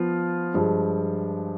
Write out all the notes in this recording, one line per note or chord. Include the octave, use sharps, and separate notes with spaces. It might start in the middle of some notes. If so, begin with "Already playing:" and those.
Already playing: F3 B3 F4
G2 F3 G#3